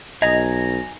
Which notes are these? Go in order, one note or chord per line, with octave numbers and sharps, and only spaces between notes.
B1 D#5 G#5 A#5